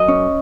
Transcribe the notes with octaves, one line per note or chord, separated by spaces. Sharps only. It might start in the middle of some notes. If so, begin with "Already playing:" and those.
Already playing: F#2 D#5
C#4